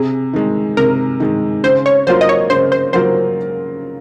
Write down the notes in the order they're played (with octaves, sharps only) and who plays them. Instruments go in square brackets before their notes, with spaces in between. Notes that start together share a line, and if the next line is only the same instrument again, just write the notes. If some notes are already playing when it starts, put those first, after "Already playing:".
Already playing: [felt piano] C3 [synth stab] G#4
[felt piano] D#3 G#3
[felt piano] C3 [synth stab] A#4
[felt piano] D#3 G#3
[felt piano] C#3 [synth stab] C5
[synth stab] C#5
[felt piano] F#3 A#3 F4 A#4 [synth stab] C5
[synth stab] D#5
C#5
[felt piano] C#3 [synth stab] C5
[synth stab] C5
[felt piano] F#3 A#3 F4 A#4 [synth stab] C5